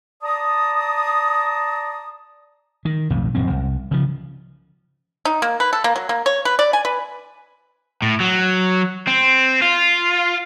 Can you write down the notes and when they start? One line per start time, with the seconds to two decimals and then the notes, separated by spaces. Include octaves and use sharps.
0.23 D5 A5 A#5 D#6
2.85 D#3
3.10 B1 F2 A2
3.35 D#1 F#2 F3 C4
3.50 C2
3.91 C#3 F3
5.25 D#4
5.42 A#3
5.60 B4
5.73 A4
5.84 A#3
5.96 F#3
6.09 A#3
6.26 C#5
6.45 B4
6.59 D5
6.73 G#5
6.85 B4
8.02 A2
8.20 F#3
9.07 C4
9.62 F4